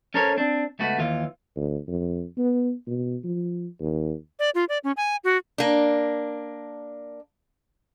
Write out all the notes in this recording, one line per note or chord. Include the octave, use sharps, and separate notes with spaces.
C#4 A4 A#4 C5 C#5
C4 D4
C#2 A3 B3 F#4
D#2 E3 F4
D2
F2
B3
B2
F3
D#2
D5
F4
D5
C#4
G#5
F#4
A#3 D4